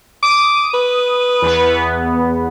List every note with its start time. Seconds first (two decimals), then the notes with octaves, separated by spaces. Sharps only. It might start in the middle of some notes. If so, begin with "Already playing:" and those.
0.23 D6 D#6
0.74 B4
1.42 E2 B3